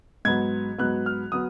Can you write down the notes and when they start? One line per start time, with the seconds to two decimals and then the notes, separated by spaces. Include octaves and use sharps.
0.25 G#2 F#3 B3 G#6
0.78 G#2 F#3 B3 F#6
1.06 F6
1.32 F#3 B3 D#6